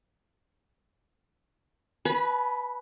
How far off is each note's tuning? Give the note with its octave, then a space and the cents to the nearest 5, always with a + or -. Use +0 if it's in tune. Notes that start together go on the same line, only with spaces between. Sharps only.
B4 +0 G#5 +45 B5 -30